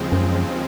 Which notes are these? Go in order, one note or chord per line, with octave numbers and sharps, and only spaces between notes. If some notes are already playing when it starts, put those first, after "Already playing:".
Already playing: D#2 C#3 F3 G#3 C4
F#2